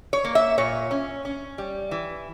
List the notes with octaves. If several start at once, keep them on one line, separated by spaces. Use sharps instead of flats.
C#5
A#3
E5
A#2 C#5
C#4
C#4
G3
E3